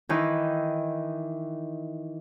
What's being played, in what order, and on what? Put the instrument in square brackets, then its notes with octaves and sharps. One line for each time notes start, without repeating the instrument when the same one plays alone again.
[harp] D#3 E3